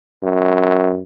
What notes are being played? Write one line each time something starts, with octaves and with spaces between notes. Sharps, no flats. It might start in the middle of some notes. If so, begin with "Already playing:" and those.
F#2